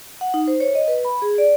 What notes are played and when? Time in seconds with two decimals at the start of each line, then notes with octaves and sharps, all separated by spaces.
0.21 F#5
0.34 D#4
0.48 C5
0.60 C#5
0.75 D#5
0.88 B4
1.05 B5
1.22 G#4
1.38 D5